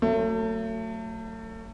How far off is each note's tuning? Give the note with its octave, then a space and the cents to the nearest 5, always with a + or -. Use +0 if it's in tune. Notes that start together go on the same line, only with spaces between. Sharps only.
F#3 +0 A3 +30